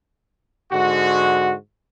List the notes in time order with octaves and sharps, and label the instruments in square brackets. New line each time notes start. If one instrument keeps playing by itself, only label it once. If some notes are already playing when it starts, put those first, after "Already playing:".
[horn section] G#2 D3 F#4